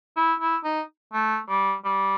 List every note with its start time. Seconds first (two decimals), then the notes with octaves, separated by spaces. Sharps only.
0.17 E4
0.40 E4
0.64 D#4
1.13 A3
1.49 G3
1.85 G3